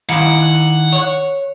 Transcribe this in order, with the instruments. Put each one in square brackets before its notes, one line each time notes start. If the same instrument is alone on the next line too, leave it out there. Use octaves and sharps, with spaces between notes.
[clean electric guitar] D#3 E4 F5 [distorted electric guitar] F#5
[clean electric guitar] C#5